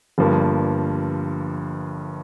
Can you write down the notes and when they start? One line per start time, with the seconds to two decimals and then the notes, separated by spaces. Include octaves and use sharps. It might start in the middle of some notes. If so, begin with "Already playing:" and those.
0.18 G1 G2 F3 A#3